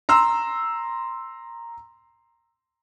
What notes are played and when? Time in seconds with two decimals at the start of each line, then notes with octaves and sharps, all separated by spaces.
0.09 A#5 C6 E6